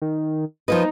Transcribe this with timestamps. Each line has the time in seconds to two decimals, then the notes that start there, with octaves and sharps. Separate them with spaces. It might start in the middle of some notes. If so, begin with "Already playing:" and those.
0.02 D#3
0.68 F3 A#3 D#4 B4